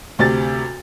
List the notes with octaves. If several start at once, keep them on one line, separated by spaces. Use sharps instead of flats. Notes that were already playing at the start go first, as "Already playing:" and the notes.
D2 C3 A6